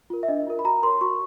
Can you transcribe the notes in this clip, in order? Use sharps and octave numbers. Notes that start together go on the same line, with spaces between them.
F4 A#4
E5
D4 D#5
E5
F4 A#4
B5
F#4 A#5
A#4 C#5 C6
F#4 C#6